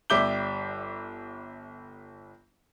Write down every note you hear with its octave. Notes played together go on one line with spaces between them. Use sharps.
G1 G3 E5 D6 G6 G7